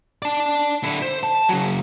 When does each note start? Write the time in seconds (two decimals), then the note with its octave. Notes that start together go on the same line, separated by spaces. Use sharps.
0.22 D5 A5
0.83 D3 E4
1.02 C5
1.23 A5
1.49 C#3 F#3